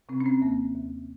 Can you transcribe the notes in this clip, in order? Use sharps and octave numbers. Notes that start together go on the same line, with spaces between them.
C3 C4
C#4
C4
D#2 A#3
D#2